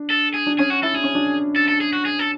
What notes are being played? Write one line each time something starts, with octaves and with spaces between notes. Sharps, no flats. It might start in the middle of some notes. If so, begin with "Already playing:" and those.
Already playing: D4
A4
G#4
D4
C#4 G#4
F#4
E4 A4
D4 G#4
C#4
D4
A4
A4
G#4
F#4
G#4
A4